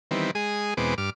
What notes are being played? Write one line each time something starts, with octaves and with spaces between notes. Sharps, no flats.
D#3 E3 G3 B3 C4
G#3 G#4 D#6
E2 B2 G#3 B3 C4 D6
G2 D6 F6